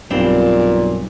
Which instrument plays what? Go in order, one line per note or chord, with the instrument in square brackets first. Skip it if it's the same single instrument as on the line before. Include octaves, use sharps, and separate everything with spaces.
[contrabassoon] B1 [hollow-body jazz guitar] G2 C4 D4 [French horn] A#2